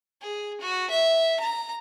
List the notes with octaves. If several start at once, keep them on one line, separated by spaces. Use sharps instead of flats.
G#4
F#4
E5
A#5